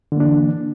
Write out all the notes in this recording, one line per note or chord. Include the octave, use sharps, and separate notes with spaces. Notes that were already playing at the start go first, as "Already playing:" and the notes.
D3 E3 A#3 D4